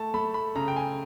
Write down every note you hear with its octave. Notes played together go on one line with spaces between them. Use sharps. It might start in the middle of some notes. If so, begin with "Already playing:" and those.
Already playing: A3 A5
A3 B5
B5
C#3 A#5
G5
G#5